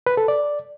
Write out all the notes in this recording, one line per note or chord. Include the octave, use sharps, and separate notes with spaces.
B4
A4
D5